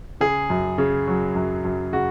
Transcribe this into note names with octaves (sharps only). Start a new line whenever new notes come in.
C#3 G#4
F#2
C#3
F#3
F#2
F#2
C#3 F#4